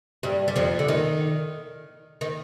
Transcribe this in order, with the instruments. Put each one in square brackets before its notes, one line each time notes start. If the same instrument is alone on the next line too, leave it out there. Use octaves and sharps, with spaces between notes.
[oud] G2 G3
G3
F2 F3
D3
D#3
D#3